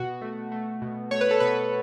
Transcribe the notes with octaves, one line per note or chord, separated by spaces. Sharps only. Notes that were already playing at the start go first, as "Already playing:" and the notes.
Already playing: B2 F#4
A3
A3
B2
A3 C#5
B4
A4
B2 B4